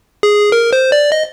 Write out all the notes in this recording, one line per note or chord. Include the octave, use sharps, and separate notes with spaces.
G#4
A#4
C5
D5
D#5